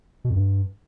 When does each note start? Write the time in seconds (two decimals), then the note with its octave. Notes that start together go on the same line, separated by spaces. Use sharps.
0.24 B2
0.30 F2
0.36 G2